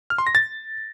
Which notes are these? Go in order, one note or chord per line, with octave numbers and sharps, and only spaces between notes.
F6
C6
A#6
A6